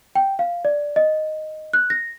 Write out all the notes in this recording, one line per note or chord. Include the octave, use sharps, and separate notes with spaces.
G5
F5
D5
D#5
F#6
A#6